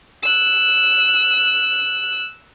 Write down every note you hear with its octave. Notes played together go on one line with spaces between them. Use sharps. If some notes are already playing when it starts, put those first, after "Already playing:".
E6 F#6